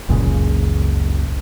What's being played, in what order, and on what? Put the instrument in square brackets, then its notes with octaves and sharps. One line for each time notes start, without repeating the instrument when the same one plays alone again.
[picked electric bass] F#1 C#2 A#2 C#3